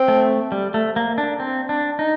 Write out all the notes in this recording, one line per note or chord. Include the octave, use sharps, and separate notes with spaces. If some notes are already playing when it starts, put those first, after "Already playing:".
Already playing: C4
A3
G3
A3
A#3
D4
C4
D4
D#4